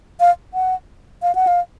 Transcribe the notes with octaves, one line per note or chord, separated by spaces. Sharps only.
F5
F#5
F5
F#5
F5